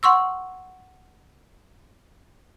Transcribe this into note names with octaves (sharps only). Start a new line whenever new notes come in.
F#5 C6 C#6 E6